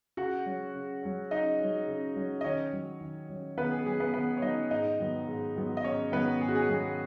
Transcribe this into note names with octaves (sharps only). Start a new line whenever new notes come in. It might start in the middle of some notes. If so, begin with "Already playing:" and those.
C#3 F#4 F#5
F#3 C#4
C#3
F#3 C#4
C#3 D#4 D#5
C#4
F#3
C#3
F#3 C#4
D#5
D#3 C#4 C#5
F#3 C#4
D#3
F#3 C#4
D#3 B3 B4
G#4
F#3 C#4 G#4
B3 B4
D#3 B3 B4
C#5
F#3 C#4 D#4 D#5
G#2 D#4 D#5
D#3 F#3 B3
G#2
D#3 F#3 B3
D#5
G#2 C#4 C#5
D#3 F#3 B3 B4
G#2 G#4
F#4
G#4
D#3 F#3 B3 G#4